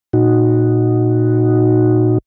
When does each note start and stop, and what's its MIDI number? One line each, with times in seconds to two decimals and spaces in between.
0.13 2.18 46
0.13 2.18 63
0.13 2.18 66